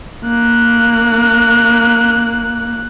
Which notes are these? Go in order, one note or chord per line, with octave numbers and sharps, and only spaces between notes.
A#3 F#6